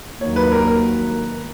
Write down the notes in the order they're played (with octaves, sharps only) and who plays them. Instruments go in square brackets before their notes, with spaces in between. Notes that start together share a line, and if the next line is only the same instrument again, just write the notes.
[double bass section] D#2 D#3 F#3 A#3 [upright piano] C#5
[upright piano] B4
A#4
A#4